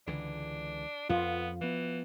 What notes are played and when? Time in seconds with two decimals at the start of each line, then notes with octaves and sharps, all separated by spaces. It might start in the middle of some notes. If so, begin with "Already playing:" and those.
0.07 C#2 D3 E3 D4
1.09 F2 B3 F4
1.61 E3 F3 B3